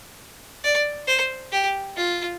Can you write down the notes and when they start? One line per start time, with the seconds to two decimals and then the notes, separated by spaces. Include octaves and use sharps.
0.64 D5
1.07 C5
1.52 G4
1.96 F4